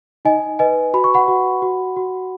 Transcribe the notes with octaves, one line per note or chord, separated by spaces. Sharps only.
D#4 D#5 G#5
B4 D#5 G#5
F#4 B5
C#6
F#5 B5
F#4
F#4
F#4